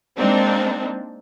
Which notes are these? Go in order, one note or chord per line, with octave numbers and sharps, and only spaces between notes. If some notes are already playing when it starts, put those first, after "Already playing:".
G#3 A#3 C4 D4 D#4